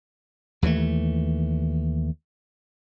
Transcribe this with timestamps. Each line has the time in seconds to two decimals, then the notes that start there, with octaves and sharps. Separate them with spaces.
0.62 D#2 E3 F3 A3